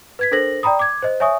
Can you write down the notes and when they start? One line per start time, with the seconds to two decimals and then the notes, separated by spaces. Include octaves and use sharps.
0.19 B4 G#6 B6
0.31 D4 A4 A#4 C5 A#6 F#7
0.63 D5 G5 A#5 B5 D#6
0.79 D6 G#6
1.02 C5 D#5
1.20 C#5 E5 G#5 C#6 D#6